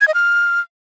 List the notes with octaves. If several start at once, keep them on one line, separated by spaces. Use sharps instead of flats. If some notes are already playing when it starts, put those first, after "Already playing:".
G#6
D#5
F6